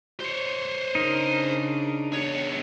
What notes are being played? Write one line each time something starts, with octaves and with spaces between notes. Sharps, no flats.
C5 C#5
C#3 D4 D#4 A#4
E2 C#5